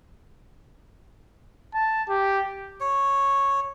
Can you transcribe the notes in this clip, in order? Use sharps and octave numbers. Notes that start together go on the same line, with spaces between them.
A5
G4
C#5